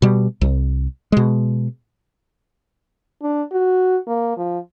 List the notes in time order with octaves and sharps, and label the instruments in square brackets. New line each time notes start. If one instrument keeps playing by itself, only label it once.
[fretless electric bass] B2 G3
C2
B2 G#3
[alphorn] D4
F#4
A#3
F3